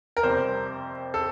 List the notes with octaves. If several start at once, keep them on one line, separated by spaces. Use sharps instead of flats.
A#4
F2 C3 G3 C5
A4